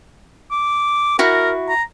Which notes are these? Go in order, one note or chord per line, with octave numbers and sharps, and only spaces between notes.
D6
E4 F#4 A#4
A#5